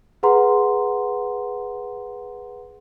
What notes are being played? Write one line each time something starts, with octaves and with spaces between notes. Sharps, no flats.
G#4 B4 F#5 A#5 C6